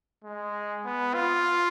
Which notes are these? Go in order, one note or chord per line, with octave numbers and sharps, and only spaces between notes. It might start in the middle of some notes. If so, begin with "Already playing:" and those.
G#3
B3
F4